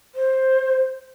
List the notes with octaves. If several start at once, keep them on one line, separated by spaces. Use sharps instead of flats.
C5